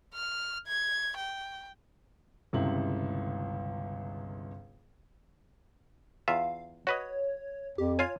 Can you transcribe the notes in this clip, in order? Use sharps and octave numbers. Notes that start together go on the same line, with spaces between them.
F6
G#6
G5
G1 C#2 C3 E4 F#7
E2 F4 E5 F5
F#4 B4 C#5 D#5
F2 G4
F4 C#5 F5 G#5